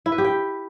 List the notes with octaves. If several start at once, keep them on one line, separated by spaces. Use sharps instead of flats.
E4
B4
G4
G5